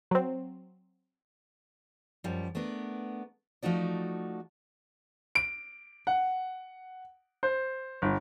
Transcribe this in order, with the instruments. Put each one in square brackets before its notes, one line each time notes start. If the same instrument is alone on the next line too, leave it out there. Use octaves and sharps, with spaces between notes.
[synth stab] F#3 C4
[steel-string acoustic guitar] F#2 F3 G3
A3 B3 D4 A#4
F3 A3 D#4 F#4 D5
[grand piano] D7
F#5
C5
G1